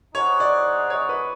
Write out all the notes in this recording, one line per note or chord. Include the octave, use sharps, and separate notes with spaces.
D#4 G#4 C5 C#5 D#5 F#5
D5
C#5
B4